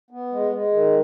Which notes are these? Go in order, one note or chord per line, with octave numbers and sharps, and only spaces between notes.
B3
G#3
G#3
D#3